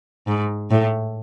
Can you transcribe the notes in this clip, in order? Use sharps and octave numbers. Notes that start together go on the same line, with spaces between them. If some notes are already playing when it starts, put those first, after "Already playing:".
G#2
A2